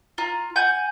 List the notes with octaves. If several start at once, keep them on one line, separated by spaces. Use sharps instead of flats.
F4 A#5
F#5 G#5 G6